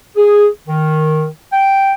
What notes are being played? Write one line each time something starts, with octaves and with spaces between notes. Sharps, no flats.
G#4
D#3
G5